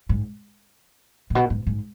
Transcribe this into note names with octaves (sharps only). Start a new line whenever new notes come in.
G#2
A2
B2
G#2
G#2